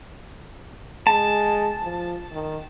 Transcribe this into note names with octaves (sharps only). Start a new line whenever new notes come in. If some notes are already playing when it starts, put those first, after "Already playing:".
G#3 A5
F3
D#3